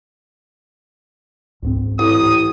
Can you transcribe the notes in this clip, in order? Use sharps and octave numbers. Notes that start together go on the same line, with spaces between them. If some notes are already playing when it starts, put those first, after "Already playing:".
C#2 G#2 C4
A1 D#6